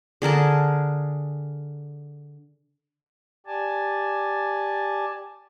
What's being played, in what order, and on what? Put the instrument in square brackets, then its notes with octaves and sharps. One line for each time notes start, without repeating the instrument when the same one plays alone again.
[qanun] D3 G#4 A#4 A5
[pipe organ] G4 D5 G#5 A5